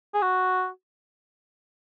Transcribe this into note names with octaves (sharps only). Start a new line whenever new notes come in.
G#4
F#4